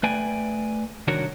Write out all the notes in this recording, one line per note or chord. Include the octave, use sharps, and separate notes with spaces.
A3 B4 D5 G5 G#5
C2 D#3 D4 F#4 A#4 C#5